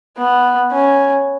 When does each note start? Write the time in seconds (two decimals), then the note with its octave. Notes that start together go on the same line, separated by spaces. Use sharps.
0.18 B3
0.73 C#4